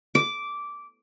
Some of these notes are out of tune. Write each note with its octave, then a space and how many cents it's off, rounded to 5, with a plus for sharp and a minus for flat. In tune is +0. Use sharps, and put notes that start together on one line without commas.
D6 -10